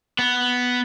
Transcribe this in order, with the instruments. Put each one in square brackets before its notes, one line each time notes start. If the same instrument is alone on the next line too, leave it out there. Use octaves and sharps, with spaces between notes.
[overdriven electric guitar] B3